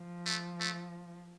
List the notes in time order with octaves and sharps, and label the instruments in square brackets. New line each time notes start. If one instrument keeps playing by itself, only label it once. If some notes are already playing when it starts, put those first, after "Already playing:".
Already playing: [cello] F3
[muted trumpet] A3
A3